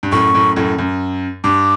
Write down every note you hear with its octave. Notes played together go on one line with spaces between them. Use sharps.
G2
F#2 A2 C#6
F#2 A2
F#2 A2
F#2
G2 D6